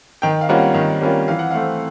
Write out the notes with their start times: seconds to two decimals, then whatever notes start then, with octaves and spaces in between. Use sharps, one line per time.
0.22 D#3 G5
0.41 F5
0.49 G3 A#3 C#4 F4 F#5
0.74 D#3
1.01 G3 A#3 C#4 F4
1.28 E3 F5
1.39 F#5
1.51 F5
1.54 A3 C4